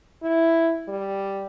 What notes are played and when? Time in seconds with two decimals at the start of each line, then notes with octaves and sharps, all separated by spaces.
0.22 E4
0.88 G3